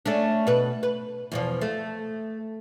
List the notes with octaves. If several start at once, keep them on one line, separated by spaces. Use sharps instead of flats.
A3 C#4 D4
B2 B4
B4
E2 B2 F3
A3